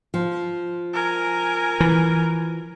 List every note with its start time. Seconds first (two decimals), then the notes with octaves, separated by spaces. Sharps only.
0.14 F3
0.94 A#4 G#5
1.80 E3